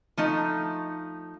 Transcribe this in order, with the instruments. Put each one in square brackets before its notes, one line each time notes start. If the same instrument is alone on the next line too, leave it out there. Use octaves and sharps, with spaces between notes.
[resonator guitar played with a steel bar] F3 A3 D#4